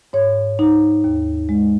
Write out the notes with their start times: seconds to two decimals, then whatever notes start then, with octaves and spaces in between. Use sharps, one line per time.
0.13 G#2 C#5
0.59 D#4
1.04 D#2
1.49 G#3